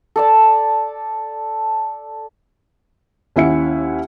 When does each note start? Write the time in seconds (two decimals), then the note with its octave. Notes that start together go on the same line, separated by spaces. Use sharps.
0.16 A4 D5 A5
3.36 D#2 C#4 E4 E5 F#5 C#7